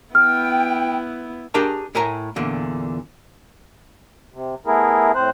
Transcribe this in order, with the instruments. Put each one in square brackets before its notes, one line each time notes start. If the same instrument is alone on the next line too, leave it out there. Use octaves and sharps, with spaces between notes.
[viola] B3 E4 [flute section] G5 [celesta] F6
[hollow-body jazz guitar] D4 G4 G#4 A#4 A5
A2 A#4 E5 G#5 A#5
E2 A#2 D3
[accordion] C3
A3 B3 E4 G#4 A#4
A2 C4 C5 F#6